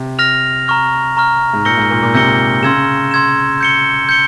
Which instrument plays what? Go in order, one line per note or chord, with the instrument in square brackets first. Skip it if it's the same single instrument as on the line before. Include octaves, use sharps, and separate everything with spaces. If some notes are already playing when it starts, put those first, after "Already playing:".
Already playing: [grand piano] C3
[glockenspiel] F6 A#6 F7
A#5 C#6 F6
A#5 C#6 F6
[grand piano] G#2
[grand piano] A#2 [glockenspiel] E6 G6 A#6 C#7 G7
[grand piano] G#2
A#2
A#2
[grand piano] C3 [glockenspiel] E6 G6 A#6 C#7 G7
[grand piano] C#3 [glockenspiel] C6 E6 G#6 E7
[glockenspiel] C6 E6 G#6 E7
G6 C#7 G7
G6 C#7 G7